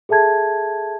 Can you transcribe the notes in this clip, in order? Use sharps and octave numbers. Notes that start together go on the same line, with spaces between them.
G#4 A4 E5 A5 G#6